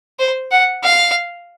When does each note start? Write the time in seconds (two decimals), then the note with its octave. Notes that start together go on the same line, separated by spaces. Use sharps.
0.19 C5
0.52 F#5
0.83 F5